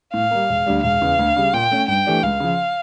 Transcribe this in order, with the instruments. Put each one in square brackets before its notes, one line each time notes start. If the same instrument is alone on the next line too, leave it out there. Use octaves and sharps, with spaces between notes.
[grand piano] A2 [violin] F5
[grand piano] G3 A#3
E1
D2 D3 G3
[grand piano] E1 [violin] F5
[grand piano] E2 C#3
D2
C#3 G3
[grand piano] A#2 [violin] G5
[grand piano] A3 C#4
[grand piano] G2 [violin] G5
[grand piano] E3 A3 D4 G4
[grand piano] C#2 [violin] F5
[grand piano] C#3 F3